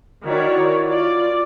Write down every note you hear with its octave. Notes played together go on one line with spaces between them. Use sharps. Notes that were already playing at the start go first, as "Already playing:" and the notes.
D#3 E4 F#4 C#5 D5
F4 D5